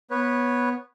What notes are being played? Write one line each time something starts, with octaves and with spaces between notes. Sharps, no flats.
B3 B4 C#5